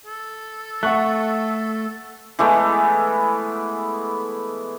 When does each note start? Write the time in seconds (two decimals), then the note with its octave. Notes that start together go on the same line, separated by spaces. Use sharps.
0.06 A4
0.83 A3 F#5 C#6 F#6
2.39 E3 G#3 A3 B3